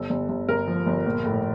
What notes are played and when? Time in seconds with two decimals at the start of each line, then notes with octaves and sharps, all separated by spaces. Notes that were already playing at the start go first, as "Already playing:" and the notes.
Already playing: G1 A4
0.10 G1
0.29 G1
0.48 G1 A#4
0.68 F3
0.87 G1
1.06 A#1
1.25 A2